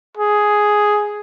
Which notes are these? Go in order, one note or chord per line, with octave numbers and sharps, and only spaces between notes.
G#4